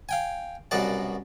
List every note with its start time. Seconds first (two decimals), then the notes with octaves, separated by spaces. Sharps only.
0.09 F5 G5 G#5
0.71 C2 F#2 B2 F#4 D5 A5